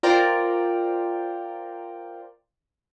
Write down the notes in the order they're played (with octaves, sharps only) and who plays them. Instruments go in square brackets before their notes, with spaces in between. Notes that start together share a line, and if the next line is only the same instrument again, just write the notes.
[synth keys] F4 A#4 C5 D5 G5 A#5